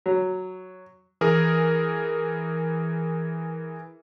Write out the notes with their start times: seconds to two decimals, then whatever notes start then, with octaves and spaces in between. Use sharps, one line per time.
0.06 F#3
1.21 E3 G#4 A#4